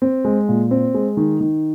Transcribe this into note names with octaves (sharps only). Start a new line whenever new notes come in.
C4
G#3
A#2
C4
G#3
D#3
D#3